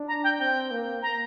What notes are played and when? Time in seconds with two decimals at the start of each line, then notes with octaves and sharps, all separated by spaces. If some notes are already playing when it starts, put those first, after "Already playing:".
Already playing: D4
0.08 A#5
0.24 G5
0.39 C4 G5
0.71 A#3
1.03 A#5